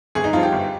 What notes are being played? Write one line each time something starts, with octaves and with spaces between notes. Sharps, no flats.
G1 G#4
D#4
G2 F3 F4
G4
G1